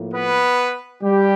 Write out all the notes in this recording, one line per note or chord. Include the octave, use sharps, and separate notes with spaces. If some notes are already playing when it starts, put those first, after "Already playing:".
Already playing: A2 F3 A#3
B3 B4
G3 G4